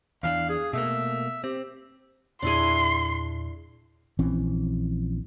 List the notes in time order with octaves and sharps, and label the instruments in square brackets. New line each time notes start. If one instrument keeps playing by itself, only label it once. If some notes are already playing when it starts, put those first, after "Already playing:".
[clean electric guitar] E2 E3 D4 [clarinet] F5
[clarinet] G#4
[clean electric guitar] B2 A3 A#3 [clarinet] E5
[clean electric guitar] C4 [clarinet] G4
[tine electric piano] E2 A#2 [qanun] D4 E4 G#4 [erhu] C6
[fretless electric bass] A#1 E3 C4 C#4